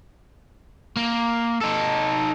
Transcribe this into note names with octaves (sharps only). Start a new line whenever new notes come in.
A#3
D#4 A4